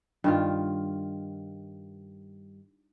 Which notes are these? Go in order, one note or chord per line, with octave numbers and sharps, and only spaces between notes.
G2 D#3 F4